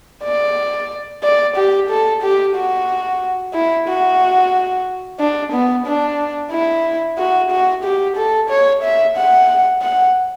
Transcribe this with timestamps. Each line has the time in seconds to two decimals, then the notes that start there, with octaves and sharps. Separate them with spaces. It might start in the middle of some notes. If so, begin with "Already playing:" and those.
0.24 D5
1.23 D5
1.56 G4
1.89 A4
2.23 G4
2.56 F#4
3.54 E4
3.88 F#4
5.20 D4
5.52 B3
5.86 D4
6.51 E4
7.18 F#4
7.51 F#4
7.84 G4
8.17 A4
8.50 C#5
8.83 E5
9.17 F#5
9.82 F#5